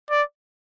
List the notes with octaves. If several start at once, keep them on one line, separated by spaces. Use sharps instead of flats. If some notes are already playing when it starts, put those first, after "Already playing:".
D5